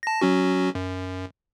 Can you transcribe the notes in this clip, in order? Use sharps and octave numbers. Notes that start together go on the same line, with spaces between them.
A5 A#6
F#3 C#4 F#4
F#2